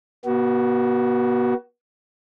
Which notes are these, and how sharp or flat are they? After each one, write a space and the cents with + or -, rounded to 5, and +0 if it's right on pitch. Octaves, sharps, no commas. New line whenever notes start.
B3 -40 F#4 +20